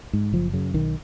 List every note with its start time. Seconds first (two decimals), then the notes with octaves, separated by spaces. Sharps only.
0.13 G#2
0.33 F#1 F3
0.53 F#2 C#3
0.74 B1 D#3